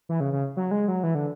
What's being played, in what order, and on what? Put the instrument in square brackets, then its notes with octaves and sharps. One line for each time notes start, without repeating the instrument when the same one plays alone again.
[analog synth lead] E3
C#3
C#3
F#3
G#3
F#3
E3
D3